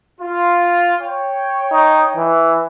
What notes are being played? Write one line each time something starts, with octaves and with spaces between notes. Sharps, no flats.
F4
C#5 G5
D#4
E3